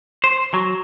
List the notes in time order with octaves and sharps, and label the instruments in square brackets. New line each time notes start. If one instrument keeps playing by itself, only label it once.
[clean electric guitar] C5
F#3